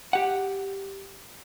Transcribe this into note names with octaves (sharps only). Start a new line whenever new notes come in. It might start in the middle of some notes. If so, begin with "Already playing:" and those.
G4 F#5